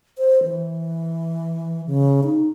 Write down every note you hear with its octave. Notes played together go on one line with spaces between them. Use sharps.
C5
E3
C#3
D#4